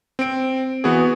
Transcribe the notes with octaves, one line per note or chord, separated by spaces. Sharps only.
C4 D7
E3 B3 F#4 G#4